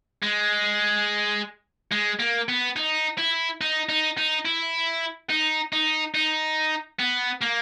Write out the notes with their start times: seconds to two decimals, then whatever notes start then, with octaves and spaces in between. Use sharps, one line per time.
0.23 G#3
1.92 G#3
2.20 A#3
2.49 B3
2.76 D#4
3.18 E4
3.61 D#4
3.89 D#4
4.18 D#4
4.45 E4
5.30 D#4
5.73 D#4
6.15 D#4
7.00 B3
7.41 A#3